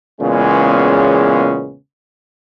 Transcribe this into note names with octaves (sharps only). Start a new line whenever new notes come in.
E2 A#2 C#3 G#3 B3 C#4